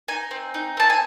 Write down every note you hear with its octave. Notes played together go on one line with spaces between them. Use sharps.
D#4 G#5
C4
D#4
C4 A5
G#5